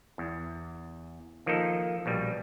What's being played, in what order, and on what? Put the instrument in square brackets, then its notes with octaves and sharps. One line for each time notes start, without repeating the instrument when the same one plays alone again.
[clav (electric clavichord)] E2
D#3 F3 A#3 D#4 A4
A#1 B2 G3